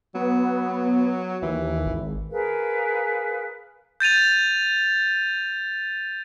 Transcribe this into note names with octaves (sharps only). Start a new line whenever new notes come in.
F#3 B3
D#2 E3
G#1
G#4 A#4 B4 F5
G6 A6 D#7 F7